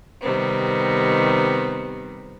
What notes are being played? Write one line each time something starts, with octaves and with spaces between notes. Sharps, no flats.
C3 D#3 G3 B3 C4